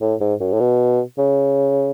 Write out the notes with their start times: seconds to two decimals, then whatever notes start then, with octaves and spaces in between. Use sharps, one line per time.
0.01 A2
0.21 G#2
0.41 F#2
0.53 A2
0.60 B2
1.18 C#3